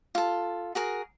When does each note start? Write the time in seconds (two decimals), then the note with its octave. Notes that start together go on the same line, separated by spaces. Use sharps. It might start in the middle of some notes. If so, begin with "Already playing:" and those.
0.15 F4 A4
0.75 F#4 G#4 A#4